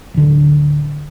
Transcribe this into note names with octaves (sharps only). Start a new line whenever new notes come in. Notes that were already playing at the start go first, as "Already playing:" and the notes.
D1 D3